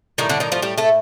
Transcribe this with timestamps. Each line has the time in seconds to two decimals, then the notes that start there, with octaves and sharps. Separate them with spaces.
0.18 A2 D#3 G3 D#4
0.29 D3 D4
0.40 D#3 D#4
0.52 F3 F4
0.62 G3 G4
0.78 A3 A4